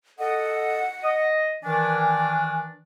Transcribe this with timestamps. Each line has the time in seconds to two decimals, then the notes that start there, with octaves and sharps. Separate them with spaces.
0.19 A4 D#5 F#5
1.03 D#5
1.64 D#3 E3 D4 G#5